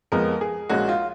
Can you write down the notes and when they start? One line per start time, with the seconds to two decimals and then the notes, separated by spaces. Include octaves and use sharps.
0.12 F2 F3 G#3 B3 A#4
0.41 G#4
0.69 A#1 A#2 G#3 C#4 F#4
0.89 F4